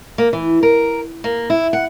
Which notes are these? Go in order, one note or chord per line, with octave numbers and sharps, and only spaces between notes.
A#3
E3
A#4
A#3
E4
F#5